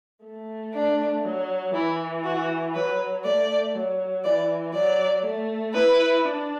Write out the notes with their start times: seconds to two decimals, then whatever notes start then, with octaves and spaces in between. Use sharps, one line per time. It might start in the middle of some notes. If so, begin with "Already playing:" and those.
0.24 A3
0.75 D4
1.25 F#3
1.74 E3 E4
2.24 F#4
2.75 F#3 B4
3.24 A3 D5
3.75 F#3
4.24 E3 D5
4.74 F#3 D5
5.25 A3
5.74 E4 B4
6.24 D4